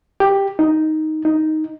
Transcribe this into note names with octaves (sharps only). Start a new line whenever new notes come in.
G4
D#4
D#4